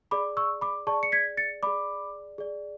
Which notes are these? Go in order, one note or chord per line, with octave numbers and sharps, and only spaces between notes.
G#4 D5 B5 D6
C#6 E6
B5 D6
G#4 D5 A5 C#6
C#7
G#6 B6
A6 C#7
G#4 D5 B5 D6
G#4 D5